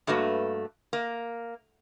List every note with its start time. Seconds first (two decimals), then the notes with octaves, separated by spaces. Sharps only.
0.07 G2 A3 A#3 F#4 B4
0.93 A#3